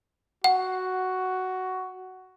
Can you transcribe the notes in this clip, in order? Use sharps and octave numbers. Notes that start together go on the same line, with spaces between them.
F#4 F#5